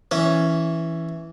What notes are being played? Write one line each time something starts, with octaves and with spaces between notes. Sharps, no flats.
E3 C#4